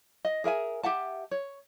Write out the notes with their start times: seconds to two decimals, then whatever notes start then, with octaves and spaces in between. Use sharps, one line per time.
0.25 D#5
0.44 G#4 A#4 E5 G#5
0.83 G4 E5 F#5 A5
1.31 C#5